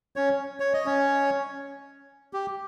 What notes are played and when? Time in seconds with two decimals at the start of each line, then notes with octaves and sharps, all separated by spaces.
0.16 C#4 C#5
0.60 C#5
0.74 D#5
0.86 C#4 C#5
2.33 G4